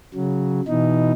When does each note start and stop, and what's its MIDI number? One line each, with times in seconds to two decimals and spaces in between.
0.14 0.61 49
0.14 0.61 54
0.68 1.12 47
0.68 1.12 52
0.68 1.12 63